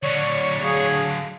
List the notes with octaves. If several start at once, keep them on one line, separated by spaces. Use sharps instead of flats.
D3 F#3 C#5 D5
G#4 F5